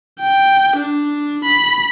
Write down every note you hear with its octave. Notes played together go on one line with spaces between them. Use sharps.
G5
D4
B5